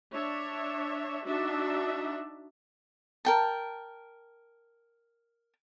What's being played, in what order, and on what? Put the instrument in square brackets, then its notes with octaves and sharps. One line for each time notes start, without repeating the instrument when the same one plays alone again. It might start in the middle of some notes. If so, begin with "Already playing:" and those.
[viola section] D4 C#5 E5
D4 D#4 F#4 E5
[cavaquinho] A#4 G5 A5